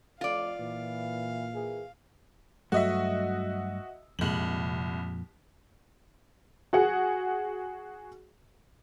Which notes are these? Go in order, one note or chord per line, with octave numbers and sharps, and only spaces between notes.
F2 A2 F4 D5 F5
A#2 E3
E3 A#3 G#4
G2 F#3 A3 F#4 D#5 E5
C2 F2 A#2 G#3 F#7
F#4 G#4 F#5